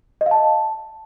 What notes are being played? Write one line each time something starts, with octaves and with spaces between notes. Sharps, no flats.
D#5
F5
A5